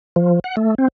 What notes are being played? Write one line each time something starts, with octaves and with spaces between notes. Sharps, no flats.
F3
F#5
A3
C4